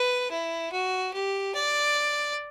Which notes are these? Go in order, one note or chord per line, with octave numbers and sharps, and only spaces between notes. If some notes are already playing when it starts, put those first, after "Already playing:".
Already playing: B4
E4
F#4
G4
D5